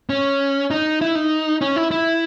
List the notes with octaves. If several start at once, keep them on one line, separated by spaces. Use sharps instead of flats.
C#4
D#4
E4
D#4
C#4
E4
E4